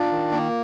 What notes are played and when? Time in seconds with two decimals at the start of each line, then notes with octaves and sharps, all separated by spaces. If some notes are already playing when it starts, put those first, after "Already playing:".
Already playing: D4 F4
0.12 D#3
0.32 A#3